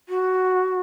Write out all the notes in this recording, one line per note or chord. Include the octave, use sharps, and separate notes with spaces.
F#4